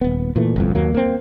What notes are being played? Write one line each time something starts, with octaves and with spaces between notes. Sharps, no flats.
D#1 B3
A#2 E3 A3
G1 C2 F2
D#2 F#3 A#3
A#3 C4